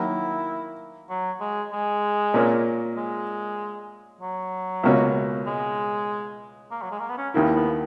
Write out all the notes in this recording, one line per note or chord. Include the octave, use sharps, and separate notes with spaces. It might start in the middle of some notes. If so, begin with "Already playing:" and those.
Already playing: D#3 F#3 A#3 E4
F#3
G#3
G#3
A#2 A#3 C#4
G#3
F#3
C#2 B2 A#3 C#4 F#4
G#3
A#3
F#3
G#3
A#3
B3
C#4
D#2 D#3 A#3 B3 E4
B3